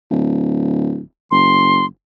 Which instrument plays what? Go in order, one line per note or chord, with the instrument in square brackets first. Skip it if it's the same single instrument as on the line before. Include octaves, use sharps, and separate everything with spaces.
[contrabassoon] D1
[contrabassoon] F#1 [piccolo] C6